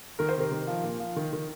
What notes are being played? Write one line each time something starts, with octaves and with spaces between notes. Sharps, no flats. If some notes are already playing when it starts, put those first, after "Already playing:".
D#3 A#4
C5
C3 A#4
D#3
F3
A#2
F3
D#3
D#3